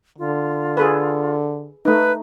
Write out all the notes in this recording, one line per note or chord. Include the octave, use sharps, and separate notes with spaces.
D3 F4
G#4 A4 B4
A3 D#4 B4